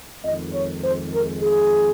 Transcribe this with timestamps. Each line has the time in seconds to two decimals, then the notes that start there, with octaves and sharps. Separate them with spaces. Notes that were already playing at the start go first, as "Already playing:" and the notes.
0.25 F2 D#3 G#3 D#5
0.54 C#5
0.84 C5
1.13 A#4
1.43 G#4